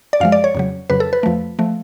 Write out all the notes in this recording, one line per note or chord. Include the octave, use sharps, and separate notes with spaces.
D5
F#2 F3 G#3 F5
D5
C#5
F2 C#3 F#3
F2 C#3 F#3 B4
A4
B4
F2 F3 A3
F3 A3